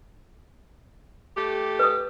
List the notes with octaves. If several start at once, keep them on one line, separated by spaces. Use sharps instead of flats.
A3 G4
B4 D#6